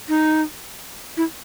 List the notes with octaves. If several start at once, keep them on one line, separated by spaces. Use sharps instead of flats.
D#4
E4